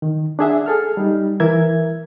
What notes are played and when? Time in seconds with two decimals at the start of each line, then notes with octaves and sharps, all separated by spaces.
0.02 D#3
0.39 D4 G#4 E5 F#5
0.66 G#4 A4 F6
0.97 G3 D#4
1.40 E3 A#4 E5 G#6